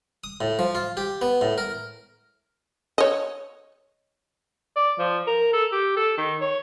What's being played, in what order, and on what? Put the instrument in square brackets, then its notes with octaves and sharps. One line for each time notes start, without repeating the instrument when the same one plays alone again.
[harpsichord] D#6
A2
F3
F4
G4
B3
A2
A#4
[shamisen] C#5 D#5
[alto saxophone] D5
F3
A#4
A4
G4
A4
D#3
C#5